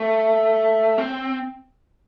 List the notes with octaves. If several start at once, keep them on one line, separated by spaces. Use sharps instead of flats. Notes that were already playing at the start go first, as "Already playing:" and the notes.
Already playing: A3
C4